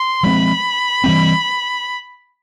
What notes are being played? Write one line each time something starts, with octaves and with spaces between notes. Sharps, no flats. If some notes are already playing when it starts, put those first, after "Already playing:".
Already playing: C6
F3 G#3 C4 B5
E3 G3 C4